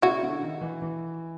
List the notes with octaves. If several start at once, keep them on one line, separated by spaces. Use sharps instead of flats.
C#3 E4 F#4
D3
D#3
E3
E3